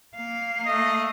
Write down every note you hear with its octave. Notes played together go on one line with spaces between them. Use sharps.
A#3 F5
A3 D#5